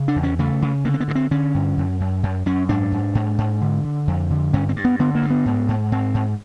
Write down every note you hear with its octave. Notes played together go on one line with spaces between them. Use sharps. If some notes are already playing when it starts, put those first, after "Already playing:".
Already playing: C#3
D4
E2
C#4
C#3 A3
C#3
D3 A#3
C4
B3
G2
C4
D3 C#4
G2
F#2
F#2
F#2
F#2 C#4
G#2 D4
G#2
G#2
G#2
D3
D3
F2
D3
G2 C#4
C4
G2
B3
D3 B3
A#3
G2
B3
G#2
G#2
G#2 C4
G#2